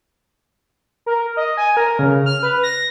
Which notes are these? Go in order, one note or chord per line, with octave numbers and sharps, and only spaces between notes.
A#4
D#5
G#5
A#4
C#3
F6
B4
A#6